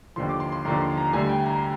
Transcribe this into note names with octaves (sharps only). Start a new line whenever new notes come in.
D#2 D3 F3 C6
D6
C6
C6
D#2 D3 F3 A#5
C6
A#5
D2 D3 G3 G#5
G5
A#5